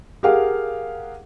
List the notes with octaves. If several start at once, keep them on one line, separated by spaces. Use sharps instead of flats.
G4 G#4 A#4 F5 F#5